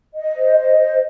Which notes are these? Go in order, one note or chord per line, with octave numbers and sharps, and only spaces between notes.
D#5
C5
D#5
C5